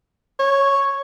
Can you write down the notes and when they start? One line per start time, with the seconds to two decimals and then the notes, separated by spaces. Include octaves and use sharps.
0.39 C#5